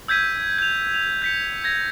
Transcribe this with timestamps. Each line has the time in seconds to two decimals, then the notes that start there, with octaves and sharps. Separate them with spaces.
0.08 E6 G6 G#6 B6 D#7
0.58 G6 F7
0.94 F7
1.22 G6 B6 C#7
1.64 G#6 A#6 F7